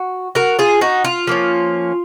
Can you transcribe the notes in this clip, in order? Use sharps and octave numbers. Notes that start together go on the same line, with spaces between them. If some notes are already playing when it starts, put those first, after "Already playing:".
Already playing: F#4
F#4 A#4
F4 G#4
D#4 F#4
F4
F3 A#3 C#4